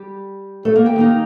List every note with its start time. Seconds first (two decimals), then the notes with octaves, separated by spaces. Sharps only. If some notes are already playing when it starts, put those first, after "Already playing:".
Already playing: G3 G4
0.65 A3 A4
0.76 A#3 A#4
0.86 G4 G5
0.96 D#3 A#3 D#4